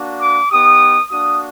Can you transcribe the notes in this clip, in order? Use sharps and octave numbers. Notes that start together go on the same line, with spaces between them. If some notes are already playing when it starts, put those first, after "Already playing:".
Already playing: A#3 D4 F#4
D6
B3 D#4 G4 D#6
A#3 D4 F#4 D#6